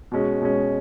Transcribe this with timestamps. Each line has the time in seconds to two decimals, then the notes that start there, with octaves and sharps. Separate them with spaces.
0.12 B2 G#3 C#4
0.42 B2 G#3 C#4